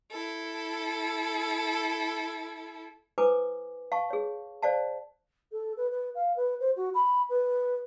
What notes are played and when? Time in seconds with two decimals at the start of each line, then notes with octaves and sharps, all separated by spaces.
0.11 E4 A4
3.18 E4 A4 B4 C5 G#5 D6
3.92 F5 A5 C#6
4.10 G#4 C#5
4.63 C5 D5 F5 A5
5.52 A4
5.77 B4
5.91 B4
6.15 F5
6.36 B4
6.60 C5
6.76 F#4
6.94 B5
7.29 B4